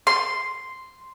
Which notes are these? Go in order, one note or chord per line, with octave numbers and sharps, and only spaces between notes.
C6